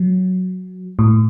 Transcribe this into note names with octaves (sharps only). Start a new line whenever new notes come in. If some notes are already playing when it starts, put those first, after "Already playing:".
Already playing: F#3
A2